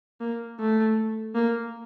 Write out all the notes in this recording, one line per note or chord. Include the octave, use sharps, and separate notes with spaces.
A#3
A3
A#3